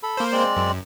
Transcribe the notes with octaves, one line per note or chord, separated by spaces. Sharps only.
A4 B5
A#3 C5
G#3 C4 D5
F#2